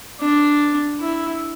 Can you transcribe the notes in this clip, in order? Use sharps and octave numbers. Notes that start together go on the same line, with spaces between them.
D4
E4